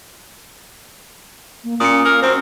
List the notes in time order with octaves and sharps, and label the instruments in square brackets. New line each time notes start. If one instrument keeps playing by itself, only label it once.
[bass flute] A#3
[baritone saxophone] A#2 [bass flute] C#4 [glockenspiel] D#6 C#7
[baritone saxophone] A#3 [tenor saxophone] A#4
[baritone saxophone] F#2 [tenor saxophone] C4